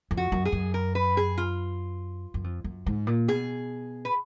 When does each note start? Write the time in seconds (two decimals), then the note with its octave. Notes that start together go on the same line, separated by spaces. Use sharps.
0.11 F2
0.17 F#4
0.32 F#2
0.45 G#4
0.52 F#2
0.74 A#4
0.95 B4
1.17 G#4
1.38 F4
2.34 F#2
2.44 F2
2.64 F#2
2.86 G#2
3.07 A#2
3.28 B2 G#4
4.05 B4